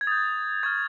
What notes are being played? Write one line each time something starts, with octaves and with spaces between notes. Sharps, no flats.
G#6
D#6 G6 A6
C#6 F6 G#6